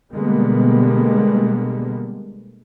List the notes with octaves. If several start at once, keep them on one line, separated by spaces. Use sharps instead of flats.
B2 D3 G3 G#3 A#3 B3